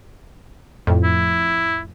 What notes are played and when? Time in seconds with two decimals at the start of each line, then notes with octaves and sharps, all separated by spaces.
0.87 F2 A2
1.03 E4